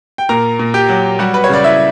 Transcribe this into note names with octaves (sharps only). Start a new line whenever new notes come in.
G5
A#2 A#4 A#5
A#2
G4 G5
F#3
G3 F#4 F#5
B4
C#5
C#3 D5
E4 E5